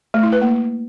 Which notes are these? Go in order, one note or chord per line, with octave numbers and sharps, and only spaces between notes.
A3
E4
B4
A#3